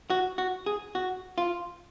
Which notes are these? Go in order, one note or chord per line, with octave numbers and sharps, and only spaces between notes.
F#4
F#4
G#4
F#4
F4